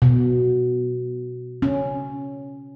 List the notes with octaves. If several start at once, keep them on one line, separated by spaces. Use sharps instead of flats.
B2
C#4